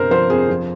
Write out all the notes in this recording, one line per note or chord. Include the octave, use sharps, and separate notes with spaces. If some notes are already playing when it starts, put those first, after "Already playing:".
Already playing: G1 C3 A#4 C5
F3 C5
F2 G#4
F3